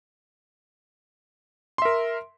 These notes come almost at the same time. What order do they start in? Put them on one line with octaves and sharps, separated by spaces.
C6 E5 A#4